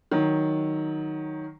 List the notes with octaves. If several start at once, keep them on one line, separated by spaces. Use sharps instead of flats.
D#3 F#3